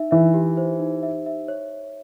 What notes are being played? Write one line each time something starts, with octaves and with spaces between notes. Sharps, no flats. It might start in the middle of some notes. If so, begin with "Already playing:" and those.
Already playing: D#4 E5
E3 E5
G4
C5
D#4
E5
E5
C#5